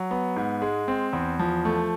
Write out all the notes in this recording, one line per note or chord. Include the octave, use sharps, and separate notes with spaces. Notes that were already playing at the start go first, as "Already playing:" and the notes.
Already playing: F#3
B3
G#2
G#3
C4
E2
F3
A3